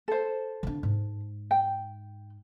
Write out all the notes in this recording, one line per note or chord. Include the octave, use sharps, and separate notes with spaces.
A4 C5
D3 D4
G#2
G5